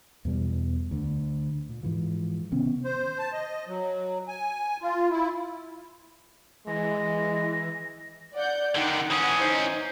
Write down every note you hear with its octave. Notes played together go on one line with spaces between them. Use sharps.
E2 B2 G3
D2 D3
A#2
G#2 E3 F3
C3 D#3 B3 C#4
C5
A5
D#5
F#3
G#5
F4
E4
E3 G#3 A#6
D5 F#5 G6
D3 D#3 D#4 F#5
E3 C#4 D#6
D#4 C5